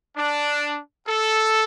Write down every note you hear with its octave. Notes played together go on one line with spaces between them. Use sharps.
D4
A4